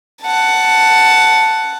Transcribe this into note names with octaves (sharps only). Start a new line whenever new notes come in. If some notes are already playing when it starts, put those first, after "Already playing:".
F#5 A5